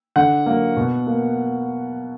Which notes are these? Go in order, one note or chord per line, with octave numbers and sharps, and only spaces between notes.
D3 F#5
F#3 A#3
B2
A#3